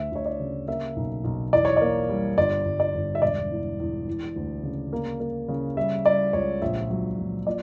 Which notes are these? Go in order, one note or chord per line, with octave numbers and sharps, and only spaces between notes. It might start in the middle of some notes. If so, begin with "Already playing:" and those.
Already playing: D2 E5
D2 C#5
D5
C#3
A#3 E5
B1
B1
E2 D5
C#5
A#3 D5
G3
G1 D5
G1
D5
G1
E5
E1 D5
E2
E2
E3
D2
C#3
A#3
A#3
C#3
G3 E5
G3 D5
C#2 C#5
A#1 E5
F#3
A#1
A#2 D5